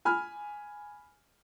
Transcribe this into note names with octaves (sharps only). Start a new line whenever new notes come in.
G#5 B5 F6